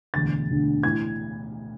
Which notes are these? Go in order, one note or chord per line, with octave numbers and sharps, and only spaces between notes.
E1 D2 D3 A6
E1 D2 D3
A2 E3 G#6